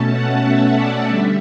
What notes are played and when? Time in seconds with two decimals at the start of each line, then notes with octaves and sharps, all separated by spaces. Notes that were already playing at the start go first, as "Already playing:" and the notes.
Already playing: B2 A3 C#4 A5
0.12 F#5
0.44 E5
0.76 D5
1.08 D3 G3 E5